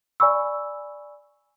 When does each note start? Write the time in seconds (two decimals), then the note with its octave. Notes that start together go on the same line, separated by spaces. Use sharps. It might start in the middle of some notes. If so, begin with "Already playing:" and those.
0.20 D5 G#5 B5 C#6 E6